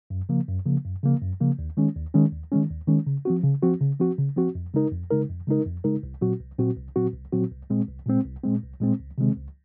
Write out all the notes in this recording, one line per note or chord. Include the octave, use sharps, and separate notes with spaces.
F#2
C#3 F3 A#3
F#2
C#3 F3 A#3
F#2
C#3 F3 A#3
F#2
C#3 F3 A#3
D#2
D#3 G#3 C#4
D#2
D#3 G#3 C#4
D#2
D#3 G#3 C#4
D#2
D#3 G#3 C#4
C#3
F3 C4 F#4
C#3
F3 C4 F#4
C#3
F3 C4 F#4
C#3
F3 C4 F#4
F2
C#3 G#3 D#4 A#4
F2
C#3 G#3 D#4 A#4
F2
C#3 G#3 D#4 A#4
F2
C#3 G#3 D#4 A#4
C2
A#2 F#3 C4 F#4
C2
A#2 F#3 C4 F#4
C2
A#2 F#3 C4 F#4
C2
A#2 F#3 C4 F#4
C2
A#2 G#3 C4
C2
A#2 G#3 C4
C2
A#2 G#3 C4
C2
A#2 G#3 C4
C#2
C3 D#3 G#3 C4
C#2